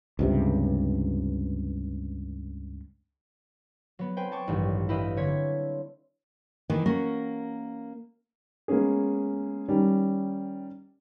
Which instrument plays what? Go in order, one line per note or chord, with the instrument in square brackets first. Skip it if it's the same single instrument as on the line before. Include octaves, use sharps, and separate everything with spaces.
[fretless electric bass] C#2 G2 C3
[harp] F#3 B3
C4 B4 C5 G5 G#5
G5 A5 C#6 D6
A1 G2 D#3 F#3 G3
E4 G4 B4 D#5 F5
D3 C4 C#5 G#6 B6
[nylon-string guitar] D#3 E3 A#3 D#4
A#3 C#4 F#4 A#4
[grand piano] G#3 A#3 B3 C#4 G#4
D#3 G3 C#4